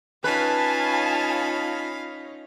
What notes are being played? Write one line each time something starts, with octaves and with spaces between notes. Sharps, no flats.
C#4 D#4 F4 B4 F5 G#5 A5 B5